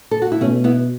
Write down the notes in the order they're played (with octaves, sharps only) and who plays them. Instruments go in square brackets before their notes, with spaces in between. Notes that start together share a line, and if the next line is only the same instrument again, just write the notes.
[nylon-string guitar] A4
F#4
E4
[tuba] B2 [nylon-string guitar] A3 C#4
[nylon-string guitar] B3 E4